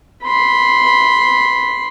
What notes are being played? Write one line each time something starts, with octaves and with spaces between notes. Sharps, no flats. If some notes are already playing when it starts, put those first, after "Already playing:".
B5 C6